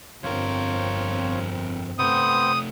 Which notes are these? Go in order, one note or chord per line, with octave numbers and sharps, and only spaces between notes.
G1 F2 C4 F4 A#4 C#5
C3 A3 B3 C4 C5 D#6